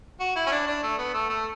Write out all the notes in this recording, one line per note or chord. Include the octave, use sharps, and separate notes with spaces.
F#4
E4
C#4
D4
D4
A3
B3
A3
A3